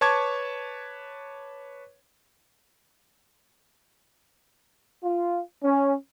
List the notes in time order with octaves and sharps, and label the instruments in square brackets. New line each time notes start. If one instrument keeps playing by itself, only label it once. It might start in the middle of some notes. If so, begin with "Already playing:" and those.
[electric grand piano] B4 C#5 A5 C#6 D6 G#6
[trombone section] F4
C#4